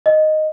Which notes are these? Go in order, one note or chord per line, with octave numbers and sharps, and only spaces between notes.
D#5